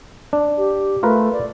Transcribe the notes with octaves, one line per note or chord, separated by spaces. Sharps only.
D4
G4
A3 F4 A#4 B4
D5